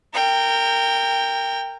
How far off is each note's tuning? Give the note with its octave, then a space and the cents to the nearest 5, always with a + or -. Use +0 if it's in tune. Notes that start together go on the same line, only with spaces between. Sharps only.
A#4 -20 G5 +10